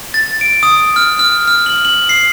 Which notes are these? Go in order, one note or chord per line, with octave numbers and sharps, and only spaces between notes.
A6
D7
D#6
F6
F6
F6
F#7
F#7
C7